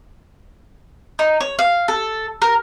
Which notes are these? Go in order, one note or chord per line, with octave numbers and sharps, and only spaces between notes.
D#4
C#5
F5
A4
A#4